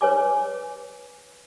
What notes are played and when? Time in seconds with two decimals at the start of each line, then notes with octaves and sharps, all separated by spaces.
0.01 B4 C#5 G#5 D6